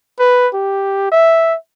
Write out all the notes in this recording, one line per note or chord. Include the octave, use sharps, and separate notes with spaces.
B4
G4
E5